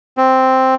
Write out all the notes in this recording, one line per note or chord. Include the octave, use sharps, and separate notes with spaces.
C4